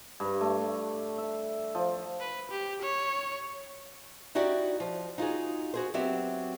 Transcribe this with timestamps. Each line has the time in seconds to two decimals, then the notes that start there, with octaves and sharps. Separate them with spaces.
0.20 G2
0.41 A3
1.18 E5
1.75 F3
2.20 B4
2.51 G4
2.82 C#5
4.35 D#4 E4 F#4 G4 D5 E5
4.80 F3
5.18 D#4 F4 F#4 G#4
5.74 F#4 G#4 C5
5.94 F#3 B3 C4 G4 E5